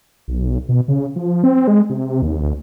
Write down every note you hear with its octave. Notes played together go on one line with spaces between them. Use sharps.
B1
B2
C#3
F3
C4
G#3
C3
D#2
D2